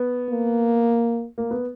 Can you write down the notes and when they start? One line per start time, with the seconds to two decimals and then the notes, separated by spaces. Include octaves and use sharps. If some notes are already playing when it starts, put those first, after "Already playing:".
Already playing: B3
0.30 A#3
1.38 A#3
1.51 B3